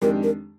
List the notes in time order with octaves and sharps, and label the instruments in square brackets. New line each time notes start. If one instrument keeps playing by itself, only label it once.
[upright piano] F2 D#3 G#3 D4 G4 [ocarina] A#4
[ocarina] A#4